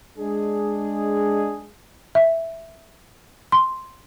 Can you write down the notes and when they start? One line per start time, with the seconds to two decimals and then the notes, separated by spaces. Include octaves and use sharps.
0.18 G#3 D4 G#4
2.15 E5
3.52 C6